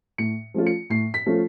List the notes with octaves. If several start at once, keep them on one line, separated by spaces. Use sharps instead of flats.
A2 C#7
F3 A3 C#4 F4
C#7
A2 C7
B6
F3 A3 C#4 F4